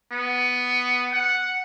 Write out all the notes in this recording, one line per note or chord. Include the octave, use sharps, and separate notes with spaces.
B3
F#5